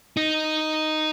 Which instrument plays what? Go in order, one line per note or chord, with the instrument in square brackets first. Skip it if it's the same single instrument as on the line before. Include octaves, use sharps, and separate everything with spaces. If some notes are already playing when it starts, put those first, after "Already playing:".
[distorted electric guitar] D#4